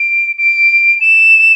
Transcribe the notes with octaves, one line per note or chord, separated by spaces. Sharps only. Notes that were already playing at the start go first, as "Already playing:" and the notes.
Already playing: D7
D7
E7